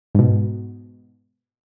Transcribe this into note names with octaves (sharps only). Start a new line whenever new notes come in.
G#2 B2